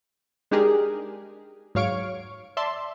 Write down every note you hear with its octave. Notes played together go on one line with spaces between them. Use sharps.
G#3 D4 D#4 G4 G#4 A#4
G#2 F#3 C#5 F5 C#6 D7
D5 E5 A5 C6